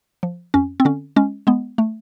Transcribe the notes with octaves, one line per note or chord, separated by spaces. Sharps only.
F3
F2 C#4
C4
D3 C#4
G#3 C#4
G#3 B3
A3